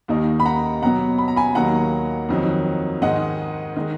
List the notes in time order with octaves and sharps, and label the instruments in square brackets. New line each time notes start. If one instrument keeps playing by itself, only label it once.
[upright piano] D#2 D#3 A#3 D#4
B5
F#5 A#5
B2 F#3 B3 F#5 A#5
B5
A#5
G#5 B5
D#2 D#3 F#3 A#3 F#5 A#5
F2 D#3 F#3
G#2 D#3 G#3 D#5 F#5
D#3 G#3 D#4